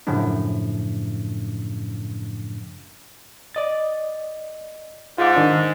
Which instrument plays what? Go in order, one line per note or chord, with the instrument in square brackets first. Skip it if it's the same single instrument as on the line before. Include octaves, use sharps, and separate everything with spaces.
[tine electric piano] F#2 A2 C#3 F3 A3 D4
[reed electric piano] D5 D#5 A6
[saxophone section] G#2 [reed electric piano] F4 D6
[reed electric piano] D#3 D4